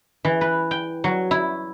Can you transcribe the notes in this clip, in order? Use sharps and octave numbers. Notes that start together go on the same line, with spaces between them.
E3
B4
G5
F#3
E4